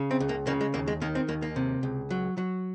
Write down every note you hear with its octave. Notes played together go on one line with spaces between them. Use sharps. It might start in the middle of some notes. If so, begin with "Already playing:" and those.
Already playing: C#3
C4
C#2
A#3
C#3 A#3
G#3
D#2 A#3
G#3
D#3 A#3
C4
D#2 A#3
A#3
C3
C#2
F#3
F#3